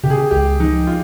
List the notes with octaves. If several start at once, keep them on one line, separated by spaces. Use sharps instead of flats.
C#3 G4
G#4
G4
C#2 G4
F3 D#4
F4